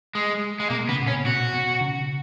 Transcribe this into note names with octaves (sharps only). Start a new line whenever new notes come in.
G#3
G#3
B2 A#3
C#3 B3
A#2
B2 C#4
B2 F#4
B2
C#3